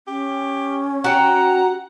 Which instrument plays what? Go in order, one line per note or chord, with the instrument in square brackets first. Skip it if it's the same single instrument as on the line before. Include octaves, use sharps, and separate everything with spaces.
[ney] C#4 [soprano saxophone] G4
[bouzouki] F#4 G5 [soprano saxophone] F#5 [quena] A#5